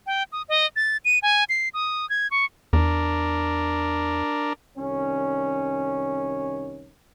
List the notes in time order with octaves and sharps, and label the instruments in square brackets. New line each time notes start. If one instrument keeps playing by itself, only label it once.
[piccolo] G5
D#6
D#5
A6
D#7
G#5
C7
D#6
G#6
C#6
[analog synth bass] E2 [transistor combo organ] D4 A#4
[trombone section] C2 D#3 C#4